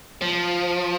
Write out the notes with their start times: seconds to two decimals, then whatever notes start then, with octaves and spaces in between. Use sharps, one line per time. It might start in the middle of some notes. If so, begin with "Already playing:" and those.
0.22 F3